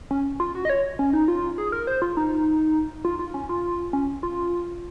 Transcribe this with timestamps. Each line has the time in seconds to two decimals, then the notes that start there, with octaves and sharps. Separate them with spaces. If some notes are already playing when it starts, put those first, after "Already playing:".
0.11 C#4
0.40 F4
0.55 F#4
0.65 D#5
0.70 C#5
0.99 C#4
1.13 D#4
1.28 F4
1.58 G#4
1.72 A#4
1.87 C5
2.02 F4
2.17 D#4
3.05 F4
3.19 F4
3.34 C#4
3.49 F4
3.93 C#4
4.23 F4